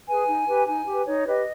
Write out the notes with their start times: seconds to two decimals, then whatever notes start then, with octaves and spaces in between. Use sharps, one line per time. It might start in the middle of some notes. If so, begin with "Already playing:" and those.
0.08 G#4 B4 G#5
0.28 D#4
0.47 G4 B4
0.67 D#4 G#5
0.86 G4 B4
1.07 D#4 C#5
1.26 G4 B4 D#5